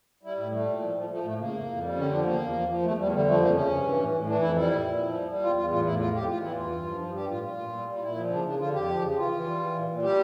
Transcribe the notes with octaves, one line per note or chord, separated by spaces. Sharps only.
G3 E4
A2 E4
G3 A3
A#2
F3
F3
F3 A3
A2 A3
C#3 A#3
F2
F2
G3
D3 C#4
F3 D4
E2 A#3
E2
F3
F3
E2 A3
E2 G3
D3 G3
F3 A3
F2 A#3
C#3 C#4
G2
E3
A2
A2
E3 D4
F2 E4
G3 E4
A#2
A#2
F3
G3
G3
E2 F4
E2 F4
A2 F4
A2 E4
F2 F4
F2 G4
E2 F4
E3 E4
G2 F4
G2
F3
G2
G3 G4
A2 F4
A#2 F4
A#2
G3
G3
F4
A#2 E4
F3
C#3 D4
C#3 D4
D3 F4
F2 G4
F3
C#3
E3 F4
E3
G3
E3
A#2
A#2
G3 G4